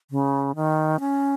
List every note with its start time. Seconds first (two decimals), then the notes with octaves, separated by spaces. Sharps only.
0.10 C#3
0.55 D#3
0.99 C#4